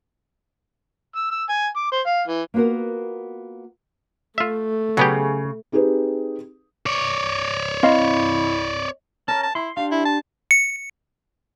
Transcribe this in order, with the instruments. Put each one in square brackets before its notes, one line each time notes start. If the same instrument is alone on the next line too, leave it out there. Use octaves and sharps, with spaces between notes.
[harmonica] E6
E6
G#5
D6
C5
F5
E3
[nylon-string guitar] A#3 B3 F4 F#4 A#4
[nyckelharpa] A3 [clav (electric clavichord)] F4 E5
[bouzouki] C#3 [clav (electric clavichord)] F#3 B3 G4
[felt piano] C4 D#4 G4 G#4 B4
[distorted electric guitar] C#5 D5
[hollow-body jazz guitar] C4 F5 C6 [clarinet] E4 [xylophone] D#5
[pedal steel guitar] C#4 A#4 [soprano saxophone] A5
[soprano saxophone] A5
[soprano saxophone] E4 [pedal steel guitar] C6
[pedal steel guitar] D4 G4 C6 [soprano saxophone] F5
[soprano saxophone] E4
A5
[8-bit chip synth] C#7